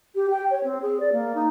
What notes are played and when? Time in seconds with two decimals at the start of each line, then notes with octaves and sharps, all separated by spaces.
0.15 G4
0.30 G5
0.50 C#5
0.63 C4
0.82 G#4
1.00 D5
1.12 A#3
1.34 D#4